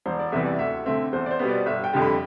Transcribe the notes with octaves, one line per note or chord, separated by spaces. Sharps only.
E1 C5
D5
E2 C3 E3 G3 E5
D5
D2 E5
D3 A3 C4 E5
E2 C5
D5
C5
B2 G3 B3
D5
G1 E5
G5
F2 D3 G3
B5